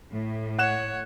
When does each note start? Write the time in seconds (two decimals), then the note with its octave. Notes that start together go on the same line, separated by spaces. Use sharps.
0.11 A2
0.59 C#5 F#5 F#6 E7